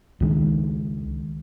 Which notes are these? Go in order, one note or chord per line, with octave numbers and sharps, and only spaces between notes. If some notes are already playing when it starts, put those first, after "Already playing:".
C#2 D#3 G#3